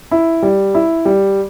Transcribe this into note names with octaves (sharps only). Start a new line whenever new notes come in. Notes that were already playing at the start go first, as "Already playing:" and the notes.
E4
G3
E4
G3